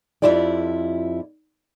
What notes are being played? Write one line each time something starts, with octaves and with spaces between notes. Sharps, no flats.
F2 F#3 E4 F4 G4 D5